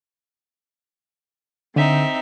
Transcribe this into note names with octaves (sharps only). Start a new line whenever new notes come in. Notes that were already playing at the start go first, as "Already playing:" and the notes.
D3 C4 D#4 E5